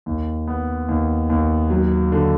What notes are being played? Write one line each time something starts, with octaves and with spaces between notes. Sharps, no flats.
D#2
B3
D#2
D#2
F#3
D3